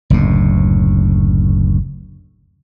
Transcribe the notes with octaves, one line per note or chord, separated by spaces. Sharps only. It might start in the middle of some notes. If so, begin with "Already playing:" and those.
F#1 D2 A2